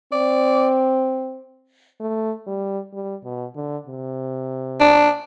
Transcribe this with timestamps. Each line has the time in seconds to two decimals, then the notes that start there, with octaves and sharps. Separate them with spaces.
0.12 C4 D5
2.00 A3
2.47 G3
2.93 G3
3.24 B2
3.55 D3
3.87 C3
4.80 D4